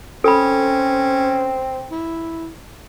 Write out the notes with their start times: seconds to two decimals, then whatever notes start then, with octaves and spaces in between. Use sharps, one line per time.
0.24 C4 C#4 A4 B5
1.91 E4